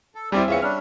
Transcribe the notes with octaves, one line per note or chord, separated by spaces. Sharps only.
A4
G3 C4 E4 G4 D5 G#5
E3 C4 C#4 F4 G#4 E5 C#7
G3 C#4 D4 F6